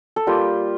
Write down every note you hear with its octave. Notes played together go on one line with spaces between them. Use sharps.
A4
G3 A#3 F4 G4